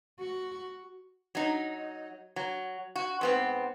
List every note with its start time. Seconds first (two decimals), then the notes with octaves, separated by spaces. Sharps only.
0.20 F#4
1.35 F#3 D#4
2.36 F#3
2.96 F#4
3.21 G#2 B3 C4